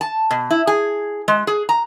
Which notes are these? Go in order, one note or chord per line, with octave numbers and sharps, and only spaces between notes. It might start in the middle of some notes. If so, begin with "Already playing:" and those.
A5
B2
E4
G#4
G#3
G#4
A#5